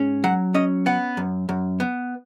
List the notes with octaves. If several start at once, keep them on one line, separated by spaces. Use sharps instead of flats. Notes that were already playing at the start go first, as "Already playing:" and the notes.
Already playing: G#2 C#4
F#3 F#5
C#4 D#5
B3 F#5
F#2
F#2
B3